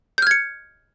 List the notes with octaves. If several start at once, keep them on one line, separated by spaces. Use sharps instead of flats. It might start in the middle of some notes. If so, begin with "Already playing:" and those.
F6 G6 G#6 C#7